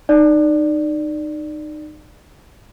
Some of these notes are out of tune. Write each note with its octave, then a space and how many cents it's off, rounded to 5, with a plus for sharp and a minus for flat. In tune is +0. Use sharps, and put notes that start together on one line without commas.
D#4 -25 D5 +0